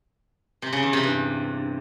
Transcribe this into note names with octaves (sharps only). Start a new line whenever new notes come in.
C3
C#3
E2
C3
G2